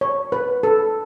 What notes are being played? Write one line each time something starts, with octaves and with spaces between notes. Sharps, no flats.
C#5
B4
A4